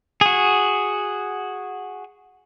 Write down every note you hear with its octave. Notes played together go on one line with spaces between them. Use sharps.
F#4 G#4